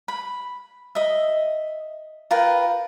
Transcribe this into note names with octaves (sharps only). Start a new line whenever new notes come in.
B5
D#5 E5
F4 A#4 B4 G5